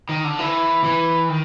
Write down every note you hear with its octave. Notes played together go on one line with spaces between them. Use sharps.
D#3
D3
E3
E3
D#3